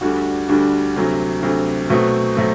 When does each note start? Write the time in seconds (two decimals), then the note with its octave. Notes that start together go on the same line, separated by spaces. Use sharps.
0.01 D2 D3 G3 D4 F#4
0.48 D2 D3 G3 D4 F#4
0.96 D2 C3 F#3
1.43 D2 C3 F#3
1.89 B2 F#3 A3 C4
2.37 B2 F#3 A3 C4